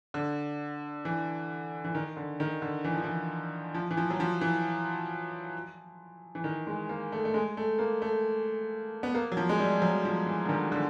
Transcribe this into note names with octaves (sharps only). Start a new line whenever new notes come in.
D3
E3
E3
D#3
D3
D#3
D3
E3
F3
E3
F3
E3
F3
F#3
F3
E3
E3
D#3
G#3
A#3
A3
A3
G#3
A3
A#3
A3
B3
A#3
F#3
F3
G#3
G3
F#3
F3
E3
D3
D#3
D3